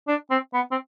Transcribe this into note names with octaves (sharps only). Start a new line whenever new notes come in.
D4
C4
B3
C4